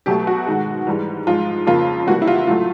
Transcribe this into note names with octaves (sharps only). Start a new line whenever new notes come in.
B2 F#3 A3 G4
F#4
G#2 D#3 G#3
G#2 E3 G3
G#2 F3 G#3 F4
F2 C#3 F3 A#3 F4
C3 E3 G3 A#3 F#4
E4
F4
A2 F#3 A3 F4